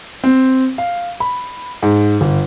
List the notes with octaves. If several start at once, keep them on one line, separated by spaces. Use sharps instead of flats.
C4
F5
B5
G#2
G1